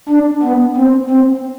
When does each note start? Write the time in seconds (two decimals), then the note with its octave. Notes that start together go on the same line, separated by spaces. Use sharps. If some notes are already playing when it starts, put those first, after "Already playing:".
0.09 D4
0.42 B3
0.76 C4
1.10 C4